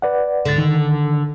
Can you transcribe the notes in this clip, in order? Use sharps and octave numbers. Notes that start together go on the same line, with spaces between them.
B4 D5 F#5
C#2 G#2 D3 A6
D#3